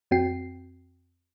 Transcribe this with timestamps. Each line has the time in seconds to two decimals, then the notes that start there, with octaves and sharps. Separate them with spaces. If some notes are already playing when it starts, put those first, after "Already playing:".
0.11 F2 C4 F#4 G5 C7